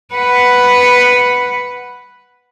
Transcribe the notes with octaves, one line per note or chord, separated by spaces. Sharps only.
B4 F#5